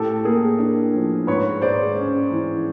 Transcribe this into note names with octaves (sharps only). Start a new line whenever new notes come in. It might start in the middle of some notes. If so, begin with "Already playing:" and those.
Already playing: A2 G4 A4
A#3 G#4 A#4
D4
F3
G#2 B4 C#5
G#3 C5 D5
C#4
E3